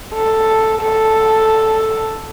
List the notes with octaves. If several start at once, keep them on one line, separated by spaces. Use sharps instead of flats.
A4
A4